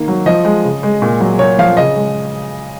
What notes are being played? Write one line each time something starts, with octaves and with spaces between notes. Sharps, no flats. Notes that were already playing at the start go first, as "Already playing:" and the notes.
Already playing: D#3 A#3
F#3
F3 D#5
G#3
C#3
G#3
A#2
F#3
A#2 C#5
F3 F5
C#3 D#5
G#3